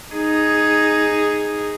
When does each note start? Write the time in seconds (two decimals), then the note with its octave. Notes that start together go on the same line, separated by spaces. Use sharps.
0.15 D#4 G#4